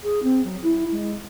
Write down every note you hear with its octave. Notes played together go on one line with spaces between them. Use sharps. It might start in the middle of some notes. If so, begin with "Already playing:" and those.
G#4
C4
F#3
E4
G#3